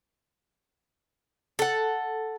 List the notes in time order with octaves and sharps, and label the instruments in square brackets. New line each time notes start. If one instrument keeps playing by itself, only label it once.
[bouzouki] A4 F#5